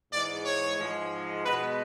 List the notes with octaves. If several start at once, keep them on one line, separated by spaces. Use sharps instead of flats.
G#2 E3 G#3 D5
C#5
G#2 F3 G#3
B2 G#3 B3 B4